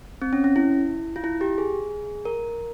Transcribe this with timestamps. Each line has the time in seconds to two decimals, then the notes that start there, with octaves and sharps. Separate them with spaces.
0.22 C4
0.33 C#4
0.44 C#4
0.56 E4
1.16 F4
1.24 E4
1.41 G4
1.58 G#4
2.25 A#4